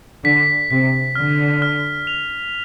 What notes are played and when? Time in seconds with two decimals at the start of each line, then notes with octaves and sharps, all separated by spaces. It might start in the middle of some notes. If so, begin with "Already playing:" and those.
0.24 D3 B6
0.70 C3 B6
1.15 D3 F6
1.62 F6
2.07 F7